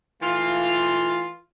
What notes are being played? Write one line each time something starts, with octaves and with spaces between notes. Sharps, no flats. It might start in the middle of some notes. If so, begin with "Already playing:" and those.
E3 A3 F4